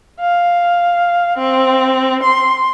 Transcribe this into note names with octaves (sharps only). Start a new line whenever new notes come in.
F5
C4
C6